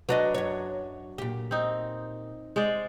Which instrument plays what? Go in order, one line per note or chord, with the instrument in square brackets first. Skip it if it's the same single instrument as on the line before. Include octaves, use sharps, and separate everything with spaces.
[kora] F#3 D4 [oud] B4 D5 D#5
[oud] F#2 C#5
A#2 G4
[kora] C4 D#4
G#3 C5 D5